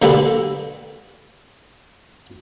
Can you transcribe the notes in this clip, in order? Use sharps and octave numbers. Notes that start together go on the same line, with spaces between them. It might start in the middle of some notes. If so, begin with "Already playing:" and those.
D3 A#3 G4 A4 B4 D5